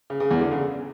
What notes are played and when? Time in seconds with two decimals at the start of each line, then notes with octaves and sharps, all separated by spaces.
0.10 C#3
0.20 C#3
0.31 E2
0.41 D3
0.51 C#3